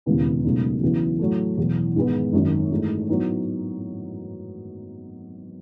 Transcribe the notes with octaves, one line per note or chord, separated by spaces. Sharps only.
E1 D#2 C#3 E3 B3
C#2 B2 F#3 A3 D#4
E2 C#3 F#3 B3 E4
A2 F#3 A3
E2 B2 F#3
G#2 D#3 G#3 B3
G#1 F#2 D#3
G#2 E3 A3
A2 F#3 B3 D#4